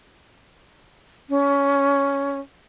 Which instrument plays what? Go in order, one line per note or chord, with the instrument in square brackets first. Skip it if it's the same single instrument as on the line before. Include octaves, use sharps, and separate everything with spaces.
[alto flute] C#4